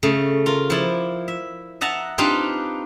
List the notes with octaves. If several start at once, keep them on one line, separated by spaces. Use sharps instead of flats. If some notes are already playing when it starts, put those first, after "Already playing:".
C#3 A3
F4 A#4
F3 E4 D5
E5
D#5 E5 F#5 A5 A#5
C4 D4 D#4 F4 G4 B4